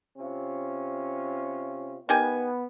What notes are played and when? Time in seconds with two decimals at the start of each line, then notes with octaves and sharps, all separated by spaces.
0.18 C3 C#4 F4
2.09 D#3 B3 G4 G#5